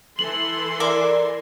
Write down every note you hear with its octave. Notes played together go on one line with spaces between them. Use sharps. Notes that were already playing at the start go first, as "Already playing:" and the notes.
E3 A4 C6 F#7
A#4 D5 E5 D6